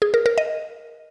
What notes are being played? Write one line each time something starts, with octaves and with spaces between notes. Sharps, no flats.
G#4
A#4
A#4
D#5